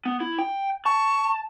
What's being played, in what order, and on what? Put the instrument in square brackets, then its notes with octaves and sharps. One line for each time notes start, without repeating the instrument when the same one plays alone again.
[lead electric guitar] B3
E4
G5
[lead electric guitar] A5 [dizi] C#6